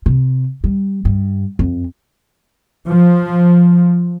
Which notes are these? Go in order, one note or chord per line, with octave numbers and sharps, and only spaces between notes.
C3
G3
G2
F2
F3